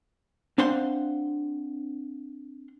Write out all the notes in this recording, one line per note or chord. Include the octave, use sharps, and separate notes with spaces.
C4 D4 C5 F5 F#5 C6